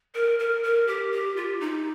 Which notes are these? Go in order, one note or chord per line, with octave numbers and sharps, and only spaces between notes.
A#4
A#4
A#4
G4
G4
F4
D#4